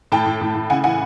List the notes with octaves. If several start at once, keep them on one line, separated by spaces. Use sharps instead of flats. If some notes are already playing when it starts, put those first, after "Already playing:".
A2 G5 A5
A2
A2
A2
C#3 F#5 G#5
E3 F#5 G#5